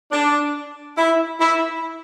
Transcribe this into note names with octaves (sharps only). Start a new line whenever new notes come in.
D4
E4
E4